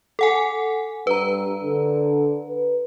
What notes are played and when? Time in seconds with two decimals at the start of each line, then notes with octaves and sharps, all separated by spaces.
0.19 A4 F#5 G#5
1.07 G2 B4 A#5
1.63 D3
2.48 B4